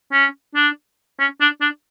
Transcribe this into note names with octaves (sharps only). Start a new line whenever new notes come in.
C#4
D4
C#4
D4
D4